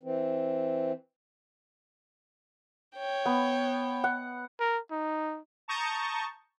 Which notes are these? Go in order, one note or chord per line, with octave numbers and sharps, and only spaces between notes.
E3 C4
C#5 G5
B3
F#5
A#4
D#4
A5 A#5 C#6 D#6 G6